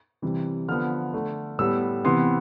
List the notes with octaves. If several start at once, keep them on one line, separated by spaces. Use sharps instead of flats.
C3 E3 G3
D3 F3 B3 F6
D3 A3
A2 G3 B3 E6
C3 E3 B3 C6